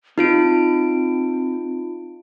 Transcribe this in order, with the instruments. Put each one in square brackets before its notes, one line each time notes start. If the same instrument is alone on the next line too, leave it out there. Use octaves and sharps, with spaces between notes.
[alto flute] C4 [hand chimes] D#4 F4 D7